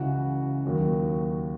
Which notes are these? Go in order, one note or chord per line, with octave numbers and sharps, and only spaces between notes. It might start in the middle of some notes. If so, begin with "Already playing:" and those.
Already playing: C#2 C#3 E3 F#4
D#2 D#3 F#3